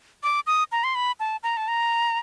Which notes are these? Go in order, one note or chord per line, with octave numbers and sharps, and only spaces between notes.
D6
D#6
A#5
C6
B5
A5
A#5
A5
A#5